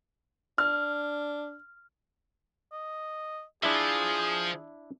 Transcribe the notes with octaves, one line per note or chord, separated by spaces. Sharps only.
D4 F6
D#5
F3 D4 E4 G#4 E5